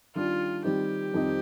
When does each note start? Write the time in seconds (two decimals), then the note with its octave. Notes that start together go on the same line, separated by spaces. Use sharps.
0.15 D#3 G3 D4 F4
0.64 D#3 G3 C4 D#4 G4
1.14 F2 D#3 G3 C4 D#4